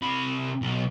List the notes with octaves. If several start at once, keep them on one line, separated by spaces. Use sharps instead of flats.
C3 B5
B1